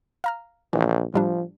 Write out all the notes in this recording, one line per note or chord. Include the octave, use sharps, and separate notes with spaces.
F5 A#5 F6
A#1 E3
A2 F3 G3 D4